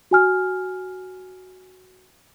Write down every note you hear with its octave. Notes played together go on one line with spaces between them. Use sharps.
F#4 G#5 F6